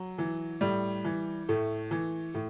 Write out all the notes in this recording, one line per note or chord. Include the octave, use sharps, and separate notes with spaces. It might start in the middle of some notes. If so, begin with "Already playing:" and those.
Already playing: F#3
E3
A2 G3
E3
A2 A3
E3
A2